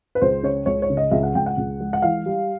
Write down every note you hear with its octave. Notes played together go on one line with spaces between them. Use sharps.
B4
C#2 C5
C#3 C#5
C#2 C#5
C#5
C#3
D#5
C#2 E5
F#5
C#2 G5
F#5
C#2
G#3
F#5
E3 F5
G3